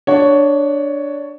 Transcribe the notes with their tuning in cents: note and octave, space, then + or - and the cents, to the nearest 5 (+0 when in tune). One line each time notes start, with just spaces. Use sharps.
D4 +0 C#5 +10 F#5 +0